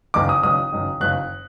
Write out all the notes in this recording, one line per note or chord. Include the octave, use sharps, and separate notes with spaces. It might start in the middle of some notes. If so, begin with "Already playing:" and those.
F#1 F#2 D#3 D6
D#6
F#1 F#2 D#3 D#6
F#1 F#2 D#3
F#1 F#2 D#3 F#6